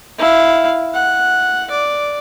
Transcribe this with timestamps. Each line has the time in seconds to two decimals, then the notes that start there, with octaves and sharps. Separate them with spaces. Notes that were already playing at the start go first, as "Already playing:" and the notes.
0.18 E4 F5
0.94 F#5
1.71 D5